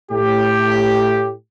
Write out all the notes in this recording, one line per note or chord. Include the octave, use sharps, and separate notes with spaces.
A2 G4